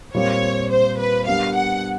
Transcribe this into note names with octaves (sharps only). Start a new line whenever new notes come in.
A#2 G3 C4 F4 C#5
C5
B4
G3 B3 D4 G4 A#4 F5
F#5